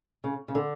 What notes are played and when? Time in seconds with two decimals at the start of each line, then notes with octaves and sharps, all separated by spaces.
0.24 C#3
0.48 C#3
0.55 D3